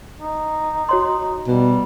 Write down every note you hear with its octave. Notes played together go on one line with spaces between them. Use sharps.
D#4
F#4 C#5 C6
B2 G3